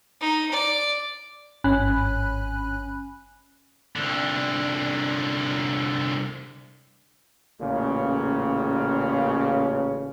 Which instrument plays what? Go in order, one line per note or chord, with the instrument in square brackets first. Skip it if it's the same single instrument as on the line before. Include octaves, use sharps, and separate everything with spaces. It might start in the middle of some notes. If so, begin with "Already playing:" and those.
[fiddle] D#4
D5
[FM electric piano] G#1 G2 C#4 G#5 B5 F#6
[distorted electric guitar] C2 D3
[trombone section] A1 A#2 C#3